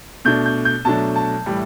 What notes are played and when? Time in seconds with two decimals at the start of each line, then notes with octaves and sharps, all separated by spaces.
0.25 B2 A3 D4 G6
0.46 G6
0.65 G6
0.85 B2 F#3 A3 D4 A5
1.16 A5
1.46 A2 E3 G3